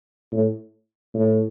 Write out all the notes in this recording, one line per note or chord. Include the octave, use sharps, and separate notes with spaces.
A2
A2